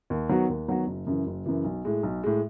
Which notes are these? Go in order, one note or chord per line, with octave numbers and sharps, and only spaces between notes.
D#2
D#3 F#3 B3 F#4
D#2
D#3 F#3 B3 F#4
F#1
F#2 C#3 E3
F#1
F#2 C#3 E3
B1
A2 G#3
B1
A2 G#3